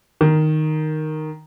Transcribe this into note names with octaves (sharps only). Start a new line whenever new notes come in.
D#3